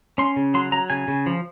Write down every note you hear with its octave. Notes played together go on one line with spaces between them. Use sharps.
C#4 C6
C#3
F#3 C6
F#3 A#5
C#3 G#5
C#3
F3